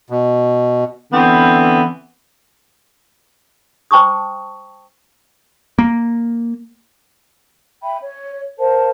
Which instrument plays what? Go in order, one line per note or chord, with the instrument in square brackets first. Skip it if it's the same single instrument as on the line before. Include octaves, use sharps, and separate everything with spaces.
[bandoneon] B2
[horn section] D3 E3 B3 C4
[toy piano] C5 G5 A5 C#6 D#6
[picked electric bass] A#3
[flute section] E5 G5 B5
C#5
A#4 C5 F5 A5